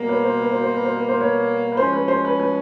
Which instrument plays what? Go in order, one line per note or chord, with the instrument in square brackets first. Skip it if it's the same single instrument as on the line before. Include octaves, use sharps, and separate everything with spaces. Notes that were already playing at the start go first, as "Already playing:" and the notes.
Already playing: [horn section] B2 G3 A#3
[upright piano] B4 C#5
C5
B4
C5
C5
B4
C5
B4
C5
B4 C#5
B4
[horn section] F3 G#3 C#4 [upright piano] C5
[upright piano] B4
C5
B4
B4